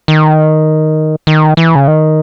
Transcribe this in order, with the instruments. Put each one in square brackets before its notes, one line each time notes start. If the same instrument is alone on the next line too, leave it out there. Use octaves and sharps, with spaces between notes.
[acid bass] D#3
D#3
E3
C#3
D#3